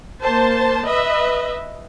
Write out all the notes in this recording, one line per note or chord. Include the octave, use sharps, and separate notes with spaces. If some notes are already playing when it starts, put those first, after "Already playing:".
A#3 C5 A5
B4 D#5 E5